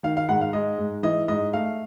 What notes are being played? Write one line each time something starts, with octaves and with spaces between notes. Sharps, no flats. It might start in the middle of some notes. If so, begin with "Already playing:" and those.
D#3 F5
F5
G#2 F#5
F5
G#3 D#5
G#2
E3 D#5
G#2 D#5
A3 F5